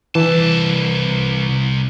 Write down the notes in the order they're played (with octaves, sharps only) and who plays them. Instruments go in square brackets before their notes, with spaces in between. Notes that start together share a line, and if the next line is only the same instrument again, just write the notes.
[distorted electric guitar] C2 A5 [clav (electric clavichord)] E3